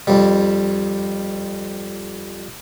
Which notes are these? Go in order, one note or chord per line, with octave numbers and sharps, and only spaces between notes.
F2 G3